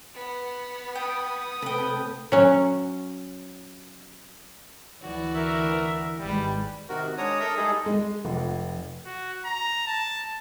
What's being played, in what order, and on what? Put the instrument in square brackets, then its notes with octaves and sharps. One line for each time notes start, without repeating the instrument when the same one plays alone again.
[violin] B3 F#5
[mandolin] G5 [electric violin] D#6
[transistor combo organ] C3 A3 A4 [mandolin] B4 G5
[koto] F#3 C#4
[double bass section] D2 E3 [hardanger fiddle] F#4 D5
[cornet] A#4 [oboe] E5
[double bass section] G#1 G#3 [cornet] G3 [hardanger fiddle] B4
[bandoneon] C3 D#3 F#4 A#4
G#3 D4 C#5 A#5 D#6
A4 A#4 E5 A#5 D#6
G3 G#3 D#4 G#4 A4
[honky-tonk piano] G#3
F1
[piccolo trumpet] F#4
A#5
A5